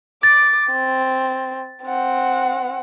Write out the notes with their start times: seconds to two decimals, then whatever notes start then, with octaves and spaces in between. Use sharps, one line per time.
0.23 D6 A6
0.72 C4
1.86 C4 F#5